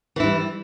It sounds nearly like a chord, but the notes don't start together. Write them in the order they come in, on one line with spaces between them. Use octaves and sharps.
E3 E4 G3